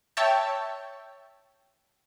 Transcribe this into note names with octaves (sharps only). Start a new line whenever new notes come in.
C#5 E5 G5 A5